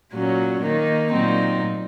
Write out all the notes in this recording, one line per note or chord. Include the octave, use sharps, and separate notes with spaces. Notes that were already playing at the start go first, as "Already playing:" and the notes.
A#2 F#3 C#4
D#3 A#3 D#4
A#2 F#3 C4 D#4